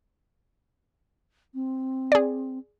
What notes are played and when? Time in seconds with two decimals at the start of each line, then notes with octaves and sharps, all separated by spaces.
1.54 C4
2.12 G#4 D5